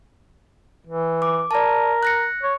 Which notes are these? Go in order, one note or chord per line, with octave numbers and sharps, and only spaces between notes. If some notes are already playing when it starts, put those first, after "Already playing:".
E3
D6
A#4 D5 A5
F#6 A#6 C#7
C#5